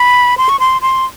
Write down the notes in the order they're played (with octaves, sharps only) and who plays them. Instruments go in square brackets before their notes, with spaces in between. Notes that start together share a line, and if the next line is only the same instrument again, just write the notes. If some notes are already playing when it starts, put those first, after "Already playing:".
Already playing: [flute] B5
C6
C#6
C6
C6